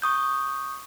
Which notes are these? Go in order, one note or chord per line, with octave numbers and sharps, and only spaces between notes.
C#6 D#6 G6